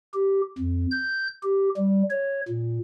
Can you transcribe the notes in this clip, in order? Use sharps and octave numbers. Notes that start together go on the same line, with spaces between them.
G4
F2
G6
G4
G3
C#5
A#2